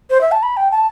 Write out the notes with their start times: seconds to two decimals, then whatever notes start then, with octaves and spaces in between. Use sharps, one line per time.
0.10 C5
0.21 E5
0.32 A5
0.43 B5
0.57 G5
0.71 A5